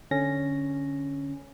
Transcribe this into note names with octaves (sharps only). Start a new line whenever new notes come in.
D3 C#4 A#6